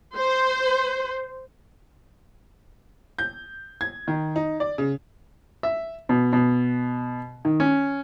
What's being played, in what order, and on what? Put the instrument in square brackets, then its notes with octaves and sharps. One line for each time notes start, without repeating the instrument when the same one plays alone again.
[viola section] C5
[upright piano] G6
G#6
D#3
D#4
D5
C#3
[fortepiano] E5
B2
B2
D#3
C#4